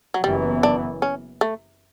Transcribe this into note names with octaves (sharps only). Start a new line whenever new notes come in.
F#3
F#1 F#2 E3 G3 B3
D4
C#4
A3